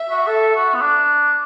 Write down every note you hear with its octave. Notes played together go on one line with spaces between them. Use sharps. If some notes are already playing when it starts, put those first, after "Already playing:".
Already playing: E5
F#4
A4
F#4
B3
D4